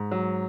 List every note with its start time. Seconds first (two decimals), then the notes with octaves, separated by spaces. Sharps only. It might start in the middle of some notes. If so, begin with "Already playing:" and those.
Already playing: G#2
0.11 F#3